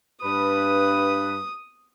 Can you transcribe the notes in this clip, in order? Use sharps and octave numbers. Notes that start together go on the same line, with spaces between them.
G2 B4 D#6